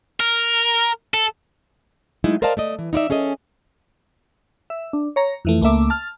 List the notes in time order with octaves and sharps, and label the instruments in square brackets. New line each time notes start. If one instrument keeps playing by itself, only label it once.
[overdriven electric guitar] A#4
A4
[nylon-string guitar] F#3 G#3 A3 D#4 E4
A#4 C5 D5 D#5 F5 A5
A3 D5 D#5
E3
D#4 E4 D5 E5
C#4 G#4 A4 D#5
[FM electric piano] E5
D4
C#5 A#5
F2 E3 A3
C#2 A3 A#3 E5 D6
A5 F6